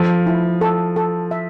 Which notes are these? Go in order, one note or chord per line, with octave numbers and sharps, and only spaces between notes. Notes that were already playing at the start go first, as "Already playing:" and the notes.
Already playing: F3 A4
E4
A4
A4
E5